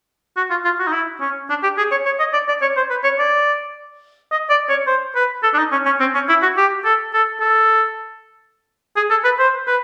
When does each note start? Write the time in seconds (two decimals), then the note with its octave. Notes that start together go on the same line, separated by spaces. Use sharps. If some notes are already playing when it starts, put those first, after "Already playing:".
0.37 F#4
0.51 F4
0.65 F4
0.79 F#4
0.87 D#4
0.92 E4
1.21 C#4
1.50 D4
1.63 G4
1.78 G#4
1.91 C#5
2.06 C#5
2.20 D#5
2.33 D5
2.48 D5
2.62 C#5
2.77 C5
2.90 B4
3.04 C#5
3.19 D5
4.32 D#5
4.50 D5
4.69 C#5
4.87 C5
5.16 B4
5.43 A4
5.54 D4
5.58 D#4
5.72 C#4
5.86 C#4
6.00 C4
6.15 C#4
6.29 E4
6.42 F#4
6.57 G4
6.85 A4
7.14 A4
7.41 A4
8.96 G#4
9.10 A4
9.24 B4
9.39 C5
9.67 B4